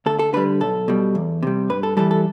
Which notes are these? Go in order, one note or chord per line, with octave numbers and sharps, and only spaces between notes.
D2 A4
A4
D3 G3 B4
B1 A4
B2 G3
E2
C3 G3
G2 B4
A4
E3 G3 A4
A4